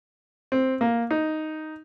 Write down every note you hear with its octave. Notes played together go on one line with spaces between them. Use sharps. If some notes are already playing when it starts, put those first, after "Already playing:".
C4
A#3
D#4